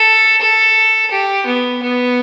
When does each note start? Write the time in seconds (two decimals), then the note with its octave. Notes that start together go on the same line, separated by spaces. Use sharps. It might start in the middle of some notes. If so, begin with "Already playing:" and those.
Already playing: A4
0.41 A4
1.11 G4
1.46 B3
1.82 B3